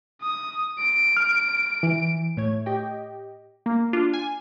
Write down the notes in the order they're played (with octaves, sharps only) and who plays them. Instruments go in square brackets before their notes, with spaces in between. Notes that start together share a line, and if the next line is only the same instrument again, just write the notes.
[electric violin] D#6
D7
[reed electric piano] F6
E3
[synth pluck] A2 A3 C#5 G#6
G4 D#5 G5
[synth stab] A#3
D4 F4
G#5